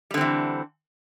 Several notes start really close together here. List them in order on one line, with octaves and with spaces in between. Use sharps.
G3 D3 C4 E3